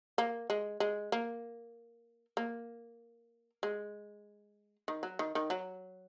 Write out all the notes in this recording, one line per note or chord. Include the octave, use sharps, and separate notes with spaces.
A#3
G#3
G#3
A#3
A#3
G#3
D#3
F#3
D#3
D#3
F#3